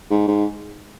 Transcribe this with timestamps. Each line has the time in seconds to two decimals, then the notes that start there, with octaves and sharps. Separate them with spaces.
0.10 G#2
0.27 G#2